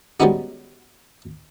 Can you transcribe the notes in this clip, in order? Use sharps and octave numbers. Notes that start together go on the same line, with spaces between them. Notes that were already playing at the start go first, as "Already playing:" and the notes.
G3 G#3 B3 C#4 D#4 F#4